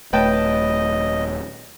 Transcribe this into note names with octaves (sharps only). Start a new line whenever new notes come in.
D#1 A3 B4 C#5 D#5 G5 A5